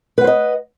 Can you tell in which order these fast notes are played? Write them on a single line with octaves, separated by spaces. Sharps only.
B4 F#5 C5 D#5